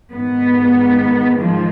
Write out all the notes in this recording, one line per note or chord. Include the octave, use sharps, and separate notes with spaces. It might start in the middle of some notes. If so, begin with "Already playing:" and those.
G#2 D#3 B3
F3